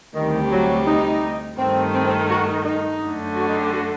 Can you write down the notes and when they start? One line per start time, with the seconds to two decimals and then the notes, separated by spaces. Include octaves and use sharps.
0.15 D2 C3 D#3 G3
0.52 F#3
0.87 D#4
1.58 G2 D#3 A3 C4
1.94 C4
2.06 C4
2.30 F#4
2.48 D#4
2.66 D#4
3.02 F#2 D3 A3
3.36 F#4
3.48 D#4
3.61 G4
3.73 F#4